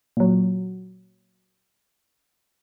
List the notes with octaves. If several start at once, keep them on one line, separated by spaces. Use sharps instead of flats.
A#2 F#3